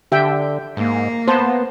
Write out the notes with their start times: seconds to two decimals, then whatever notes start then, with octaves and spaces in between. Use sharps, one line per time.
0.12 D3 G4 E5 G5
0.77 G#2 A#3
1.28 B3 C5 A5